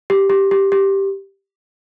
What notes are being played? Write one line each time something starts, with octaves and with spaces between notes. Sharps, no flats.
G4
G4
G4
G4